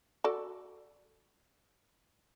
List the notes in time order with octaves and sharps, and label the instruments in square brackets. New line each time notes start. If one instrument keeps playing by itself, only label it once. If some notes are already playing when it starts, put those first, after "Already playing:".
[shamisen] F#4 A4 D5